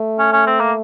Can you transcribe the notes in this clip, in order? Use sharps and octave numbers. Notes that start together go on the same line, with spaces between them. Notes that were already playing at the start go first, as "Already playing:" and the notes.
Already playing: A3
C#4
C#4
C4
A#3